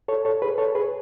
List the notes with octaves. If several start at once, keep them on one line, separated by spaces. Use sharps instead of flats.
A4 C#5
A4 C#5
G#4 B4
A4 C#5
G#4 B4